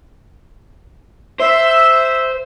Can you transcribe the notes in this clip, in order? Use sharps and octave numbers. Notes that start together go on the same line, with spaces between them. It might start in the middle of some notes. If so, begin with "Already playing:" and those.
C5 E5